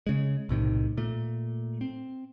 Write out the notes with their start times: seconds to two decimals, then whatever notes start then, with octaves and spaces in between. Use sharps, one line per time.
0.07 C#3 G#3
0.49 B1 A2 C3 D#3
0.97 A#2 A3
1.81 C4